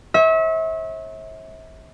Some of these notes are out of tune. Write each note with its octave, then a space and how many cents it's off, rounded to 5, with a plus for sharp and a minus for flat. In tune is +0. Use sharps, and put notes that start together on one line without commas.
C#5 -40 E5 -35